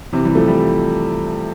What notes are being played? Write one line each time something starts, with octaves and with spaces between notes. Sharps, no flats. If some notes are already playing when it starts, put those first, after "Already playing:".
C3 E3
E3 G3
F3 A3
E3 G3